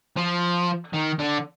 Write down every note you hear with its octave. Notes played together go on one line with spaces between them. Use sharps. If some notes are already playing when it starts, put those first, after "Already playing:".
F3
D#3
D3